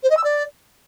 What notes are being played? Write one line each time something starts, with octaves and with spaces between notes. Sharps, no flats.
C5
D#5
E6
D5